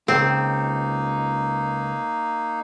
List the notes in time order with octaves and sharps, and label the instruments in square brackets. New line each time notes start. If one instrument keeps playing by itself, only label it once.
[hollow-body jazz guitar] C#2 [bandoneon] A#3 D#4 [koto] C4